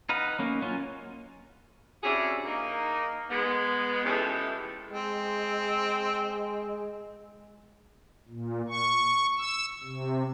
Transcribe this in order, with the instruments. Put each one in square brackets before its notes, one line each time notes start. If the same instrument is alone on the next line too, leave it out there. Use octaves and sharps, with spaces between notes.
[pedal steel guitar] D#4 B4 F5 F#5
A#3 C#4
F#3 C#4 F4
[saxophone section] C3 C#4 D4 E4 F#4 G#4
A#3 D#4
G#3 B3
E3 F3 G#3 A3 C#4 G4
[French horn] G#3 [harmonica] C4
[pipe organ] A#2
C#6
E6
C3